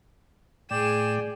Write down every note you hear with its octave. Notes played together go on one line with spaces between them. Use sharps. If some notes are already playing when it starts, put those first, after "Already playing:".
A2 G#4 D5 G5 E7